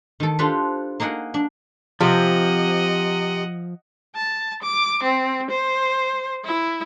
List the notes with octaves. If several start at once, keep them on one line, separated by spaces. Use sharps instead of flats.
D#3 A4
D4 F4 G4 A4 B4 C5
A#3 D#4 G#4 A#4 F#5
D4
C3 F3 D#5 F#5
A5
D6
C4
C5
E4